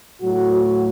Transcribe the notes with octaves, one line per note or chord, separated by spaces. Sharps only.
A2 F#3 A3 F#4
F#4